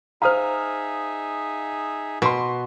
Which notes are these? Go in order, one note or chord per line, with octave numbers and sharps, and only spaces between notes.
D#4 G#4 C5 E5 F5 A#5 D#6 F6
B2 B4 C6